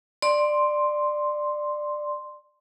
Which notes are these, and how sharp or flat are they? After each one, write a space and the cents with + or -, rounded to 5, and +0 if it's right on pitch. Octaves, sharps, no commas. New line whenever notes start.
D5 +15 C6 +0